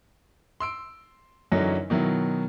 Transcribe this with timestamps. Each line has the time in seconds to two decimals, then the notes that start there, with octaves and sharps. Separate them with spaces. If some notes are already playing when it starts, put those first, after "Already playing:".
0.60 C6 E6 D7
1.52 F#2 D3 E3 F#3 C#4 D#4
1.90 B2 D#3 F#3 E4